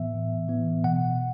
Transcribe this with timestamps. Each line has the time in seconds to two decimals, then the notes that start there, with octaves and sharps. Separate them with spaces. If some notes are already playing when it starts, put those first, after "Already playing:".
Already playing: A2 E3 B3 E5
0.13 A2
0.49 E3 B3
0.84 B2 F#5